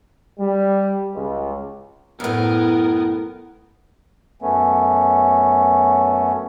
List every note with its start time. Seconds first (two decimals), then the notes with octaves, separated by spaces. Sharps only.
0.40 G3
1.15 C#2
2.20 F#2 A2 B3 A#4
4.42 F#2 A3 B3 C#4